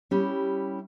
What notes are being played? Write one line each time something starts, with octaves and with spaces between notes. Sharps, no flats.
G3 C#4 E4 G4